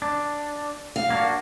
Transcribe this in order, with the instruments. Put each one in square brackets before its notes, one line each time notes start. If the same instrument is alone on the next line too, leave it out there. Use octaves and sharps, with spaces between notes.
[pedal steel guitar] D4
[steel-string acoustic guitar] F5
[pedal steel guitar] A#3 D4 F#4